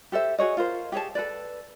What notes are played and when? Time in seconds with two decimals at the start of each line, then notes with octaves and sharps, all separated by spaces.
0.12 G4 A4 C5 E5
0.38 F#4 G#4 C#5 D#5
0.57 F4 A#4 C5
0.92 G4 G#4 C#5 A5
1.15 A4 B4 D5